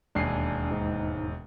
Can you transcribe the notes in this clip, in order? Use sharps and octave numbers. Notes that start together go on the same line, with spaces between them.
E1 D#2 D4 G#5 C7
G#2 D#4